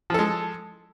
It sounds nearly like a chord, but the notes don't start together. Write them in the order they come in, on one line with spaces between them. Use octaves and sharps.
F3 A4 G#3